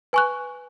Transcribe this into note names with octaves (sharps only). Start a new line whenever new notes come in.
B4 G#5 C#6 F#6